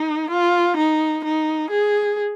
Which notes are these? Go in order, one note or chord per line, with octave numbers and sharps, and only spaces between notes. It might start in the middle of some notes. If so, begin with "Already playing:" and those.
Already playing: D#4
F4
D#4
D#4
G#4